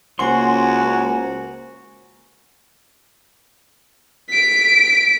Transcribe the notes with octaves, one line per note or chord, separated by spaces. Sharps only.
C#2 A#3 F#4 C5 C#5 F#5 G#5 C6
B6 D7